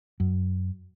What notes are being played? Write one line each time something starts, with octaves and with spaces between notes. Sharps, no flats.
F#2